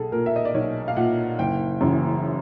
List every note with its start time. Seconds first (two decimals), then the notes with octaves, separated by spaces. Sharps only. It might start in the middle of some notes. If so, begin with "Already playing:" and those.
Already playing: B1 G#4 A4
0.12 A#2 A#4
0.26 E5
0.36 D#5
0.45 D5
0.54 B1 C#5
0.88 F5
0.96 A#2 F#5
1.39 F#1 G5
1.81 F#2 C#3 E3